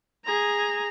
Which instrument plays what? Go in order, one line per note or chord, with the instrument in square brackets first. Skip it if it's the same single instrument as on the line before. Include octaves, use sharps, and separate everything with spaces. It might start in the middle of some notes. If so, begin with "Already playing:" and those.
[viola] G#4 A#5